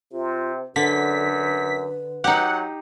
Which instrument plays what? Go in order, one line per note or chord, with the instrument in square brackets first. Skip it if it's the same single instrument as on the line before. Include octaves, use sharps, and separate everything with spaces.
[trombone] C3 [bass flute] F4
[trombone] F#2 [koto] D3 [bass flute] B4 [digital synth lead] B6
[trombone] F#3 [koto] D#4 G4 [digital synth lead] F#5